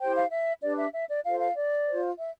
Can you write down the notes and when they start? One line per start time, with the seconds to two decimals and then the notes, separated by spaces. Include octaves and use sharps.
0.01 E4 G4 C5 G5
0.17 F5
0.32 E5
0.62 D4 G4 B4 D5
0.78 E5
0.93 E5
1.09 D5
1.25 F4 A4 C5 F5
1.40 F5
1.56 D5
1.86 F4 C5
2.18 E5